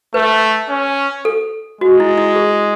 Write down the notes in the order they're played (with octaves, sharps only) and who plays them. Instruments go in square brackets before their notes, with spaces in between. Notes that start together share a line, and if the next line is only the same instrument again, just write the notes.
[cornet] A3 [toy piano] B4
[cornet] C#4
[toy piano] A4
[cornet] G#3 [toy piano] F#4
[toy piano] E4
E4
G#4